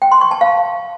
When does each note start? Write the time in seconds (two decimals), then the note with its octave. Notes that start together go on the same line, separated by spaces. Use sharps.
0.02 G5
0.12 C6
0.21 C#6
0.31 A5
0.41 F5